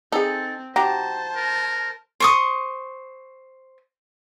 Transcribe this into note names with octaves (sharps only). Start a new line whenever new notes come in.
C4 D#4 G#4 A4
D#3 F#4 G4 C5 A5 A#5
A#4
C5 C#6 D#6